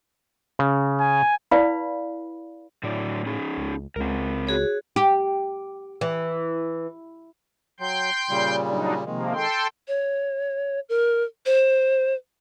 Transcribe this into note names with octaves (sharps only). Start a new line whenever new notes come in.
C#3
G#5
E4 B4 D5 F5 B5
A2 D3 F#3 D5
C#4 D#4 G#4
C#2
C#2 C4 A#4
F#4 G#4 C#5
G4
E3
F#3 G5 C6 G6
A#2 C#3 G3
F#3 D4 D#4
C3 D#3 F3 G#3 A#3
A4 G5 C6
C#5
A#4
C5